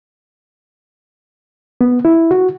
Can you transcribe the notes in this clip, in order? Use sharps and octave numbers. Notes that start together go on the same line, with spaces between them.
B3
E4
F#4